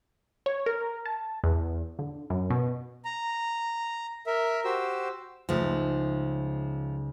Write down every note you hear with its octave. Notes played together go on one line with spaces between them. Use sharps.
C#5
A#4
A5
E2
D3
F#2
B2
A#5
A#4 E5
F#4 G4 C5 E6
C#2 F3 A3 D#4